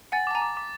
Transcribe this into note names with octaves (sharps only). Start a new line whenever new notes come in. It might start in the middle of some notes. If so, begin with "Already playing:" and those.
F#5 G#5 A6
A5 D6
G#5 A#5
D6
D6